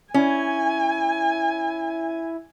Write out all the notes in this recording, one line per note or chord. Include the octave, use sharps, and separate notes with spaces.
C#4 E4 G#5